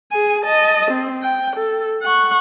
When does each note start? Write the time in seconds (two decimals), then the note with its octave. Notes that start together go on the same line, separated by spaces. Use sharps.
0.12 G#4 G#5
0.45 D#5 A5
0.91 C4
1.22 G5
1.56 A4
2.03 F#5 C#6